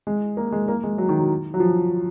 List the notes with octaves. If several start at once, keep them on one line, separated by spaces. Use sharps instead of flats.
G#3
A#3
G#3
A#3
G#3
F#3
D#3
F#3
F#3
F3